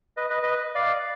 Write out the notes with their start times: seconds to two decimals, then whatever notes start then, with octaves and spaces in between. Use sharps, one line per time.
0.17 B4 D#5
0.30 B4 D#5
0.42 B4 D#5
0.75 D5 F5